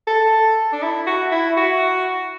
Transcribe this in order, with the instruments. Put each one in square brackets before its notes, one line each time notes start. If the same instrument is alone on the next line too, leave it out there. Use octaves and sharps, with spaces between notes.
[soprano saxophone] A4
D4
E4
F#4
E4
F#4